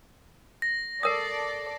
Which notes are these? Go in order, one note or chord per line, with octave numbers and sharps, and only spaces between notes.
A#6
A4 A#4 D5 D#6 A#6 C7